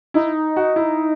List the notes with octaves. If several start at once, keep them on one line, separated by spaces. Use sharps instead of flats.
D#4 E4
F#4
E4